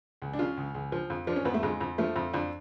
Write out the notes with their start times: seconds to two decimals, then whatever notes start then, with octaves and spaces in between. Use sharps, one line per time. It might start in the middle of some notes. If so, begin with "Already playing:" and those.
0.22 C#2
0.33 D4
0.39 C#3 F4
0.57 C#2
0.75 C#2
0.92 F3
1.10 F2
1.27 F3 D4
1.36 C#4
1.45 F2 B3
1.54 A3
1.63 F2 G#3
1.81 F2
1.98 F3 A3
2.16 F2
2.33 F2 D4